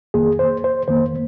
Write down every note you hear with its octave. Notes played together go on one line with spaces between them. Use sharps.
F2 D#3 A#3 G#4
C5
C5
F2 D#3 A#3 C5